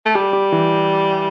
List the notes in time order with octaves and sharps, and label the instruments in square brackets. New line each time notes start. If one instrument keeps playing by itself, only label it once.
[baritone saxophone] A3
[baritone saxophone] G3 [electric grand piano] G4
[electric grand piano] G4
E3